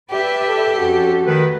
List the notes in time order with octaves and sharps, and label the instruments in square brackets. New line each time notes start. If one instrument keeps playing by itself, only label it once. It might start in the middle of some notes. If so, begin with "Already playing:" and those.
[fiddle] G4 [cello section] B4 D5 E5
[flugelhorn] A4
[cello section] F2 C#4 A4 [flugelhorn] F#4
[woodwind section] D#3 B4 [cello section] A3